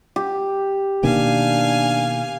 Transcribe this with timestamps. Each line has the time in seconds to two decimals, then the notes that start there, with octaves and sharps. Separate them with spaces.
0.16 G4
1.04 B2 D#3 A#3 D4 F5 G#5